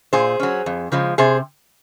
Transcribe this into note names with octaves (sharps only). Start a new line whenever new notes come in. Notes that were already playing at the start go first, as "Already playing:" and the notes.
A#2 G#4 C5
F#3 C#4
F2
C#3 F3 G#3
C3 G#4 C5